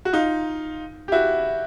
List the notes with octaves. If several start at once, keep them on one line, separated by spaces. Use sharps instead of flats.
F#4
D#4 F4
G4
E4 F#4